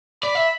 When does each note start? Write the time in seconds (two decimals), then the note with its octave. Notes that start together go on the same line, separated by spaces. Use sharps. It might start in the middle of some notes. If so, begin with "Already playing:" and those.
0.23 D5 B5
0.35 E5